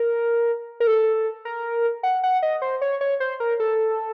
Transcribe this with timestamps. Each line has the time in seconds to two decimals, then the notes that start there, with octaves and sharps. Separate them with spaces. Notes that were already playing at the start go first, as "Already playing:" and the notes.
Already playing: A#4
0.80 A#4
0.87 A4
1.45 A#4
2.03 F#5
2.23 F#5
2.43 D#5
2.62 C5
2.81 C#5
3.01 C#5
3.20 C5
3.40 A#4
3.60 A4